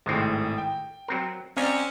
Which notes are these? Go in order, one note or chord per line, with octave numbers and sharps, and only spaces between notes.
G#1 A2 C3 G#3 C4
G5
F#3 C4 A#4
C4 C#4 D5 D#5 F5 A#5